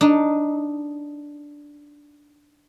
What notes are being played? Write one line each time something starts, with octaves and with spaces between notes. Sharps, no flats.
D4 D#4